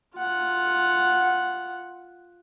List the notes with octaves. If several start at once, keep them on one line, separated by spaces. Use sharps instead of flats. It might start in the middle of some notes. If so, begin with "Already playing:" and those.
F4 F#5